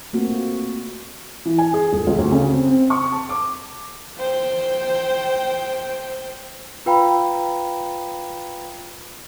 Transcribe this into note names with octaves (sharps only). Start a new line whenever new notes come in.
A3 A#3 C4 F4 F#4
E3
G#5
G#4
D#1
C#2
D2
C#3
C4
C4
C#6
A5
D6
C5 G5
F4 B4 F5 G5 A#5 B5